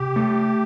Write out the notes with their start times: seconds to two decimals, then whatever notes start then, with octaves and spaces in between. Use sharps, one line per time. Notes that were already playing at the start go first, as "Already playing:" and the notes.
Already playing: C3 G4
0.16 A3